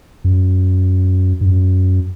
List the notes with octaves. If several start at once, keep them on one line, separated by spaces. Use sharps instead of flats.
F#2
G2
F#2